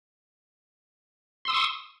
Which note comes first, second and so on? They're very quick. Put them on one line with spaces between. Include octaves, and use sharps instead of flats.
C6 E6 D#6 C#6